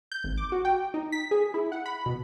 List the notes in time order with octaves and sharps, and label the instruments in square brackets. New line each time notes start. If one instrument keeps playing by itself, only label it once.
[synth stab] G6
G#1
D6
F#4
G5
D#4
B6
G#4
E4
F#5
B5
B2